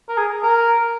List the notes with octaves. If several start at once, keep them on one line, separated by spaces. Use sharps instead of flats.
A#4
G#4
A#4